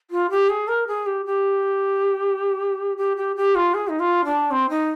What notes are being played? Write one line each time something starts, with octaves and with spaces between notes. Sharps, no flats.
F4
G4
G#4
A#4
G#4
G4
G4
G4
G4
G4
F4
G#4
D#4
F4
D4
C4
D#4